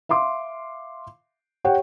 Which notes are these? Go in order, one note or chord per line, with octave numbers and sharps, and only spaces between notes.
E5 F5 C6 D6
G4 C#5 F#5 G5